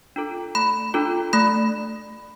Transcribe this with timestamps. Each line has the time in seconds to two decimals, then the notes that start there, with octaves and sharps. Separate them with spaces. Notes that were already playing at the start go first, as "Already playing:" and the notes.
0.16 D4 F4 A4
0.55 A3 B5
0.94 D4 F4 A4
1.33 A3 B5